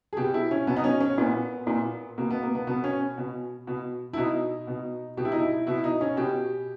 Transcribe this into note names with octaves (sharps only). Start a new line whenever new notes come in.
G#4
B2 G4
E4
C#4
B2 B3
D#4
C#4
C#4
A#2 B3
A#2
B2 A#3
B3
A#3
B3
B2 B3
C#4
B2
B2
E4
B2 D#4
B2
B2 G4
E4
D#4
E4
B2 E4
D#4
C#4
B2 G4